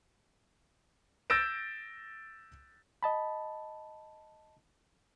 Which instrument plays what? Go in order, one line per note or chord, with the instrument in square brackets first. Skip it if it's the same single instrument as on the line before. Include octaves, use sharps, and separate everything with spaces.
[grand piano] E6 G6 A6 A#6 D7 E7
[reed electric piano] D#5 A5 B5